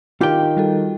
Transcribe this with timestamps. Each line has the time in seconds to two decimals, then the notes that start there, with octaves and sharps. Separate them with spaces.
0.21 D#3 F4 G4 G5
0.57 G3 F#4 A4